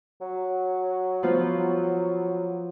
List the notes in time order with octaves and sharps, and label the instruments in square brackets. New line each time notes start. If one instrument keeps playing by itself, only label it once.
[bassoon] F#3
[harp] F3 B3 F4